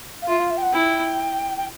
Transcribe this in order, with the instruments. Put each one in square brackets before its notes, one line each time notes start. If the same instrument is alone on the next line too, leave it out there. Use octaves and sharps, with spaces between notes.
[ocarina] F5
[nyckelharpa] F4 [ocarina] E5
[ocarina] F5
E5
G5
F#5
[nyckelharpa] E4 [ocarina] G5
[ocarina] G5